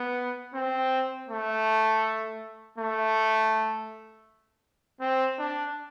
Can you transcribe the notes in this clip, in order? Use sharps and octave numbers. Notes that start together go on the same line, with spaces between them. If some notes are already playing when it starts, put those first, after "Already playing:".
Already playing: B3
C4
A3
A3
C4
D4